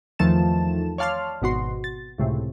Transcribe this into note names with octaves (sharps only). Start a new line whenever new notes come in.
E2 D#3 F3 A3 A5 E7
C#5 D5 F5 A5 C6 F6
G#1 B2 F#4 C6
A6
C#2 A2 C3